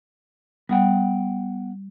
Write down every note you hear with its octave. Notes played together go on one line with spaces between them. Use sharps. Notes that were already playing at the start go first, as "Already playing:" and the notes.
G3 B3 F#5 G5